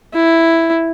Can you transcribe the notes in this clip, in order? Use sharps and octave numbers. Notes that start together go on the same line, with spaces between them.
E4